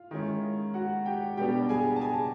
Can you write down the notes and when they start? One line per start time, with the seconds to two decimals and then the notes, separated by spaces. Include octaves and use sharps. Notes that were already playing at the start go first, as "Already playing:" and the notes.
Already playing: F4 F5
0.11 D#3 G#3 C#4 E4
0.74 F#4 F#5
1.06 G4 G5
1.37 B2 G3 B3 D4 G4 G5
1.69 G#4 G#5
1.96 A5
2.01 G#4 G#5